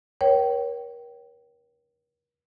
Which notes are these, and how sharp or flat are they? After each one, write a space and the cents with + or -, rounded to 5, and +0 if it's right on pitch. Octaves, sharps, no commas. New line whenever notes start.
A#4 +40 C#5 +0 G5 -25